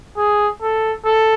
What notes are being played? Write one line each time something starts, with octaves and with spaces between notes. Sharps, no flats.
G#4
A4
A4